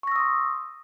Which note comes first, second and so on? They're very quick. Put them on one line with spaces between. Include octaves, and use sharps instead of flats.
C#6 A#6 E6 D#6 C6